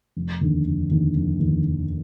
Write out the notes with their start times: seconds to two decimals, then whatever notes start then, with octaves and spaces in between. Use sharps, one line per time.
0.17 F1
0.41 D#2 D3
0.65 F1
0.91 D#2 D3
1.15 F1
1.39 D#2 D3
1.65 F1